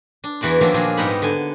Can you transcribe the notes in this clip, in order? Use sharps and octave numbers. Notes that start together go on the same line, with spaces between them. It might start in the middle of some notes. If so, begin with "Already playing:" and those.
D4
E2 E3 F#4 D5 C6
D#3 F3 F#3 A#3 D4 E4
A#2 F3 D4 F#4 G#4
G#2 G3 B3 D#4 F#5 B5
D3 G#5